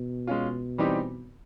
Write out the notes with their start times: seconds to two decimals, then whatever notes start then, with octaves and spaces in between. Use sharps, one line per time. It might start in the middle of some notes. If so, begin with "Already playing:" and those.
Already playing: B2
0.27 G#3 C#4 F4
0.78 E3 G3 C4 D#4 G4